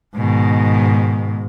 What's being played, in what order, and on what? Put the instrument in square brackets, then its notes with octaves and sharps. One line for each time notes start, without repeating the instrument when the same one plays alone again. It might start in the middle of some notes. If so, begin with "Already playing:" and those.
[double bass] G#2 [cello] B2 D#3